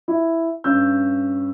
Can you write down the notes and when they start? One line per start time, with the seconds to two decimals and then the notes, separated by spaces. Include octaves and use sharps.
0.08 E4
0.64 G2 C#4 E6 G6